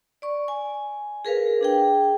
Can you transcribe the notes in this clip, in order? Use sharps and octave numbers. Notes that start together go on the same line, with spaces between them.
D5 C#6
G#5
G#4 A#4 B4 F5
D4 G#4 G5